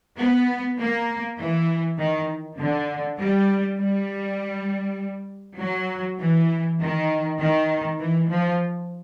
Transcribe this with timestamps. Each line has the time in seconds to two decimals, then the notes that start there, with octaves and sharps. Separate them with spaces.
0.18 B3
0.78 A#3
1.38 E3
1.98 D#3
2.58 D3
3.18 G3
3.79 G3
5.59 F#3
6.19 E3
6.80 D#3
7.39 D#3
7.99 E3
8.29 F3